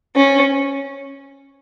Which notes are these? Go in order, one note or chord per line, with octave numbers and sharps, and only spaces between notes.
C#4